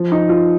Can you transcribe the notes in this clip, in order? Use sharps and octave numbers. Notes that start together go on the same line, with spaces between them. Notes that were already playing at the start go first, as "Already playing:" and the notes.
Already playing: F3
D#4
F4